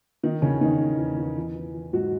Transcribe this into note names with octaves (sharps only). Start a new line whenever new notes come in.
D#3 D#4
E2 C#3 C#4
E2 D#3 D#4
E2
E2
E2
E3
E3
E3
G#2 F#3 F#4